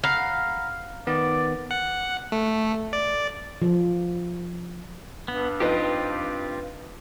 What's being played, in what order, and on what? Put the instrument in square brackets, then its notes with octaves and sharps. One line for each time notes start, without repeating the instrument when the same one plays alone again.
[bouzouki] F5 [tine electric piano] F#5 A#5 B5
[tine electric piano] D#3 B3 [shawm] D5
[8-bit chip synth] F#5
A3
D5
[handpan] F3
[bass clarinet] G2 [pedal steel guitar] B3
[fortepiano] F3 D#4 B4 [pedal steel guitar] C4 F4 G4